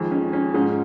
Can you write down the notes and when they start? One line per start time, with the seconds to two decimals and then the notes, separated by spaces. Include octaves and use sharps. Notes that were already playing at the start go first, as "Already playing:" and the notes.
Already playing: F2 D#3 G#3
0.11 C#4
0.33 C#4
0.54 G#2 F3 G#3 C#4